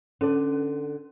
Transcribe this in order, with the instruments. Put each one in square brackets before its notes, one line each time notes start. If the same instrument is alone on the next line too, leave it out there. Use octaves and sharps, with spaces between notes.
[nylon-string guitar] D3 A4 D5 [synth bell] C#4